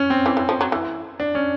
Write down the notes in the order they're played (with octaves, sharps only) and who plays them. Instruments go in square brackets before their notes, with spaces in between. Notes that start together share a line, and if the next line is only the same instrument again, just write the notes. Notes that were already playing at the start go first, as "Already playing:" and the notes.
Already playing: [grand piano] C#4
C4
[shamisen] E3
E3
F3
F#3
E3
[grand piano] D4
C#4